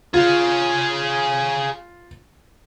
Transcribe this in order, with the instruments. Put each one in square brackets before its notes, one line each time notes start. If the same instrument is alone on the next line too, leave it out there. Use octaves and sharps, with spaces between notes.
[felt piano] F4 [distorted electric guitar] G#4 F5